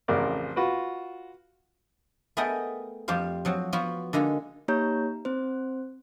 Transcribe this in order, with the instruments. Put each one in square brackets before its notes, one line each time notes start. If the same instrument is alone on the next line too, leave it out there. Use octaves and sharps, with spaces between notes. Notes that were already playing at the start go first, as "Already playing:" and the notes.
[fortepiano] A1 F2 C#3 A#4 D5
F4 F#4 B4
[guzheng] A3 B3 G#4 A#4 D#5 G5
F2 G3 G4 C5 F5
F3 F#3 C4
F3 B3 F4 F#4
D3 G#3 A#3 D#4
[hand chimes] A#3 D#4 G4 C#5 A#5 G6
C4 C5